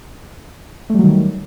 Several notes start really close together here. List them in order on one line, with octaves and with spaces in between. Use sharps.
A3 G3 F#3 D#3